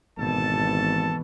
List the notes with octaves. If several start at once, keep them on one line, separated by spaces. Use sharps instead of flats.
G#1 B2 E3 A4 A5